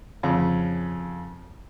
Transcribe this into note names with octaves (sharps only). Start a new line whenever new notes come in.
F2 C#3